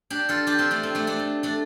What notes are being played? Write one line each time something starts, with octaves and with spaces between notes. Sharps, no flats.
D4 G4
F4 A4
D4 G4
C4 F4
A3 D4
C4
A3 D4
A3 D4
A3
A3 D4